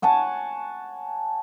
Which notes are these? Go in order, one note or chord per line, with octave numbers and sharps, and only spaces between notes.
C#5 F#5 G#5 A5